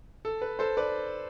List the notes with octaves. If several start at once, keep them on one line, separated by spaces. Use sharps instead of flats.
A4
B4
A4 C5
B4 D5